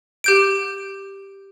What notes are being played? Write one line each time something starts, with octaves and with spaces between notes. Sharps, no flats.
G4 G6 D7